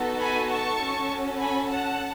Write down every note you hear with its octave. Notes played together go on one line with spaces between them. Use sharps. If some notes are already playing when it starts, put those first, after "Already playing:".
Already playing: B3 D#4 F#4 A4
G#5 B5
A5 C#6
C#4 F#4 A4
G#5 B5
F#5 A5